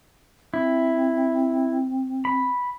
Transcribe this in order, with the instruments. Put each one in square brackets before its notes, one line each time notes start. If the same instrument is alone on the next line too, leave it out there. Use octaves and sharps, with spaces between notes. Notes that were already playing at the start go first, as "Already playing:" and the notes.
[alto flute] C4 [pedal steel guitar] E4
[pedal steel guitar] B5